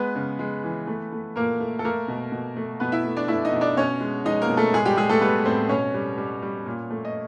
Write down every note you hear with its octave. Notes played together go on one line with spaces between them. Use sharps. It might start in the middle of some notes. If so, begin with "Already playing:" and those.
Already playing: G#3 B3 B4
C#3
G#3
E3
A3
A3
A#2 A#3 A#4
A3
A4
A3 A#3 A#4
B2
B2
A3
B2 B3 B4
E4 E5
A3
D4 D5
A3 E4 E5
D#4 D#5
B2
D4 D5
B2 C#4 C#5
G#3
G#3 D#4 D#5
A#3 A#4
B2
A3 A4
A2 G#3 G#4
G3 G4
G3 G#3 G#4
A3 A4
G3 B3 B4
A2 C4 C5
B2 C#4 C#5
G3
G3
G3
A#2
A3
D#5